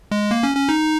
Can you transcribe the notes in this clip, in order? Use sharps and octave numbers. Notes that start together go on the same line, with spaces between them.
G#3
A#3
C#4
C#4
D#4